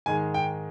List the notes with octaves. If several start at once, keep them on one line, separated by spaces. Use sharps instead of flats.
G#2 D#3 G#3 G#5
G5